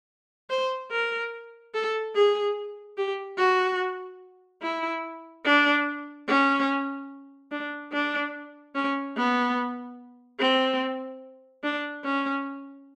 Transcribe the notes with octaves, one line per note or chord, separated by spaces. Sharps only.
C5
A#4
A4
G#4
G4
F#4
E4
D4
C#4
D4
D4
C#4
B3
C4
D4
C#4